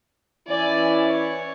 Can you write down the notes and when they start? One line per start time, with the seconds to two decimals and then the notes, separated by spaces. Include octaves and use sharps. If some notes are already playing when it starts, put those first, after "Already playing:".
0.48 E3 C#4 E4 D5 G#5
1.06 C#5